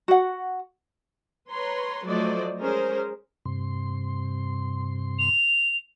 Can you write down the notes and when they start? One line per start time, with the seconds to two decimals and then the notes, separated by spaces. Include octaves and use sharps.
0.08 F#4 F#5
1.50 B4 C#5 A#5 C6
2.04 F3 F#3 A3 C5 D5 D#5
2.59 G#3 C#4 G#4 A#4 C5
3.45 G2 C3 C6
5.19 F7